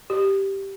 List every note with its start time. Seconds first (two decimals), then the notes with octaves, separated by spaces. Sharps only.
0.10 G4